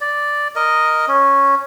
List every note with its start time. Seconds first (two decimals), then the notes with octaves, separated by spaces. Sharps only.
0.01 D5
0.56 A#4 D#5
1.08 C#4